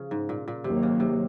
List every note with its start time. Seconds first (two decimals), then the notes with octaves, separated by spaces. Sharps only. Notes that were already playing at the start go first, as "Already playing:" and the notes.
Already playing: C#3 F3
0.11 G#2
0.29 A#2
0.48 A#2
0.64 D#2 C3 D#3 F#3 A#3
0.83 C#3
1.00 C3